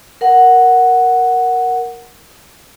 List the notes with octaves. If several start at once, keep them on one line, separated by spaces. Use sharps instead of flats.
A#4 F#5